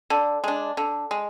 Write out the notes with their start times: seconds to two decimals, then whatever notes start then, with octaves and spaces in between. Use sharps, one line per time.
0.10 D3
0.44 G#3 D4
0.77 D3
1.11 G#3